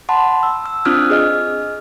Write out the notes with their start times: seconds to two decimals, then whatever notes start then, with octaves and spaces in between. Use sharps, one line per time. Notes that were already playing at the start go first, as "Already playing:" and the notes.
0.09 F#5 A5 B5 C6
0.43 E6
0.66 E6
0.85 C4 D4 F4 D#6 F6 F#6
1.10 G#4 D#5 F6